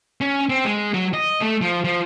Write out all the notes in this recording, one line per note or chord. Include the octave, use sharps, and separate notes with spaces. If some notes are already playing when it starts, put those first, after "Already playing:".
C#4
C4
G#3
F#3
D#5
A3
F3
F3